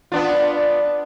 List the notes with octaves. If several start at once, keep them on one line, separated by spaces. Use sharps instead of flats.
B3 D4 F4